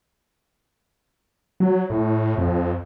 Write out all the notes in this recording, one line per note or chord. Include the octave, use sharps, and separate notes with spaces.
F#3
A2
F2